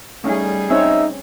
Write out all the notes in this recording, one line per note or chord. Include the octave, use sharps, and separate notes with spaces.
G3 A3 C#4 D#4 G#4
C4 C#4 D#4 C#5 E5